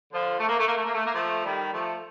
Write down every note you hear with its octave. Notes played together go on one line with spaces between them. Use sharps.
D3 F3
A3
A#3
A3
A#3
A3
A#3
A3
A#3
F3 A3
D#3 G3
F3 A3